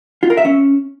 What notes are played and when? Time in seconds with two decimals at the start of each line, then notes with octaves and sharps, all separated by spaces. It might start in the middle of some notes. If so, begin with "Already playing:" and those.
0.23 F4
0.30 A#4
0.37 E5
0.45 C#4